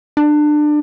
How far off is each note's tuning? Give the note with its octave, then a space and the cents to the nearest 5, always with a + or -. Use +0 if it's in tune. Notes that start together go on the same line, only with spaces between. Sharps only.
D4 +25